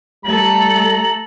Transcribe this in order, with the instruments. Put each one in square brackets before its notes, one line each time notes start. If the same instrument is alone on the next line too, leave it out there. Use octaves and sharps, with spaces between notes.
[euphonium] G3 [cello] A3 A4 [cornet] A#5 [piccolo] F#7